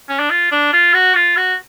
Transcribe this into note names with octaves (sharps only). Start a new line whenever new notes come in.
C#4
D4
F4
D4
F4
F#4
F4
F#4